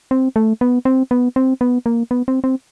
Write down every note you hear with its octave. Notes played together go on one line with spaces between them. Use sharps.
C4
A3
B3
C4
B3
C4
B3
A#3
B3
C4
C4